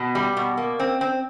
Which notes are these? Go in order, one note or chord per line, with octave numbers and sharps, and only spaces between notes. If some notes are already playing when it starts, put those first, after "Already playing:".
Already playing: B2
G3
B2
A#3
C4
C4